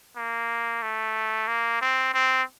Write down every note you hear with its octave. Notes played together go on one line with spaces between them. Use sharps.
A#3
A3
A#3
C4
C4